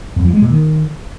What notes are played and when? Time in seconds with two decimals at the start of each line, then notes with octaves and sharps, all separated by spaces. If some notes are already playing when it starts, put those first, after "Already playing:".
0.16 F2
0.25 F3
0.33 G#3
0.42 A#2
0.50 D#3